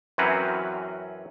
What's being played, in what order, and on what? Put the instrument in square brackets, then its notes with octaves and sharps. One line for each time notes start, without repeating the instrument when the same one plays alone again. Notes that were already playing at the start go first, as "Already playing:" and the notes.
[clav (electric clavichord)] F#2 E3 F#3 C4 C#4 B4